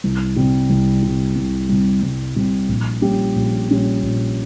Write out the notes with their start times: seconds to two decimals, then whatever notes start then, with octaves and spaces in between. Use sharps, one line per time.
0.04 C2
0.36 C3 G3
0.70 C2
1.03 C3 G3
1.36 C2
1.69 C3 G3
2.03 C2
2.35 C3 G3
2.68 A#1
3.02 A#2 G3 C#4 G4
3.35 A#1
3.68 A#2 G3 C#4 G4
4.02 A#1